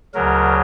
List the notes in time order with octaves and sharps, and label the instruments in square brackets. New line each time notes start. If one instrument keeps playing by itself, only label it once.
[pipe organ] D2 C#3 F#3 A#4